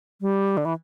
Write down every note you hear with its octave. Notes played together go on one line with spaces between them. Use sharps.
G3
D3
E3